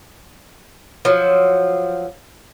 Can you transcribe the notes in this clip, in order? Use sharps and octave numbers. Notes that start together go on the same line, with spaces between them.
F3 F#3